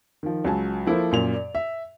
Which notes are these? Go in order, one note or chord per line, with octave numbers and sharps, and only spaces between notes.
D#3 F3
C#2 F#3 G#5 A5
F3 A#3 E4 A4 C5
F#2 A#2 F7
D5
E5